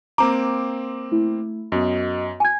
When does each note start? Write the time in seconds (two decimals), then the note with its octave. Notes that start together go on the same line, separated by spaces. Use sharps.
0.18 A#3 C4 A#5 D6
1.12 A3 E4
1.72 F#2 B3 F#4 D#5
2.40 G#5 G#6